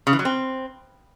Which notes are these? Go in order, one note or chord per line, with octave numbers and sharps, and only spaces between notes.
C#3
E3
F#3
C4